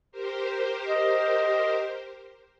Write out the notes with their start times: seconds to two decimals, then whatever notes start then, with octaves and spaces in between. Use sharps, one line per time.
0.12 G4 A#4 C5
0.87 D#5